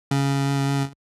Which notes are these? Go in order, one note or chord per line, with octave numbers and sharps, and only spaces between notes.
C#3